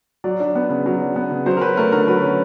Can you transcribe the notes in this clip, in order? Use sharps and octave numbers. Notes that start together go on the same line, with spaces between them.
F#3 D5
D4
B3
C#3
F#3
D4
B3
C#3
F#3 C5
A#4
C#4 B4
A3 A#4
D3 A#4
F#3 B4
C#4